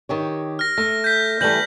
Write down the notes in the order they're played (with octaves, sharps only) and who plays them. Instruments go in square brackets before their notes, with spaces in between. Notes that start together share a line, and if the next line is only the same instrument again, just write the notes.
[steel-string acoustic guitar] D#3 G4 C#5
[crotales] F6 A#6
[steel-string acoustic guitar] A3 [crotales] A#6
[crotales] G6 B6
[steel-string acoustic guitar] E3 G3 A3 [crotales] G6 F#7